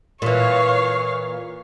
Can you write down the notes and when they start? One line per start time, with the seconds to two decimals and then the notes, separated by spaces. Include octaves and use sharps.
0.22 A#2 E3 C#5 F5